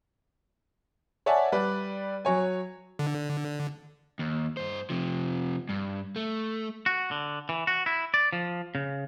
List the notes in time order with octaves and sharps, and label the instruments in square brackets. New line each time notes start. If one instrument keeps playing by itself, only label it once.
[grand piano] C#5 D5 E5 F#5 G#5 A5
G3 B4 D5
F#3 C#5 G#5
[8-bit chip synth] D3
[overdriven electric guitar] D#2
G2 C5
C3 F3
G2
A3
[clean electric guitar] F#4
D3
E3
F#4
E4
D5
F3
C#3